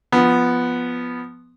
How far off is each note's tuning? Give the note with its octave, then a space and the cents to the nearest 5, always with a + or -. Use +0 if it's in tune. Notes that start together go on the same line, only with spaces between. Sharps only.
F3 +0 B3 +0